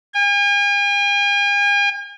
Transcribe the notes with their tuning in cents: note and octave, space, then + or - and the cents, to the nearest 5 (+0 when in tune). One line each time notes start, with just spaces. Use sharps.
G#5 -45